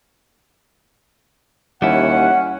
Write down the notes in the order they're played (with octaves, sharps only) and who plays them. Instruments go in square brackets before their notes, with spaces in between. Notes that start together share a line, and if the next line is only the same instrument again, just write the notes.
[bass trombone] D#2 [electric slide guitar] G3 E4 [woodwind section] C#4 C#5 F#5